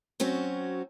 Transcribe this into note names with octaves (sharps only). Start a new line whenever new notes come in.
F#3 C4 C#4 F#4